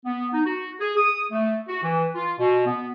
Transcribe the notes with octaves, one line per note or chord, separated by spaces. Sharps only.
B3
D#4
F#4
G#4
D#6
A3
F#4
E3
F4
B2
B3